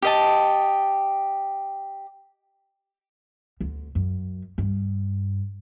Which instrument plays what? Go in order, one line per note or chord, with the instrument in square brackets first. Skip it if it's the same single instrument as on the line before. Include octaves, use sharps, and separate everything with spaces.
[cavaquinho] G4 D#5 A5
[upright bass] D2
F#2
G2